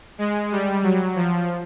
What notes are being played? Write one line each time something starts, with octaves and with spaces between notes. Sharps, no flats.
G#3
G3
F#3
F3